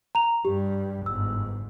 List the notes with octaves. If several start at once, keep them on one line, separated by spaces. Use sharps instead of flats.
A#5 F7
G2 G3 G4
G1 G#2 E6